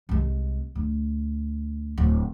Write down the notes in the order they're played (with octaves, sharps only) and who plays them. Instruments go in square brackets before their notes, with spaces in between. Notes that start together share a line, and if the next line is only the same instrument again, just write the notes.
[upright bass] C2 G#3
D2
D1